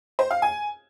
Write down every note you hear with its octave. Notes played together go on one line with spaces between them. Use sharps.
C5
F5
G#5